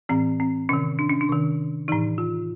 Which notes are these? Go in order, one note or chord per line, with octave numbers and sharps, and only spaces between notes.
A2 E3 C4
C4
C3 D#3 C#4
D4
C#4
D4
C3 D#3
A2 E3 D#4
F4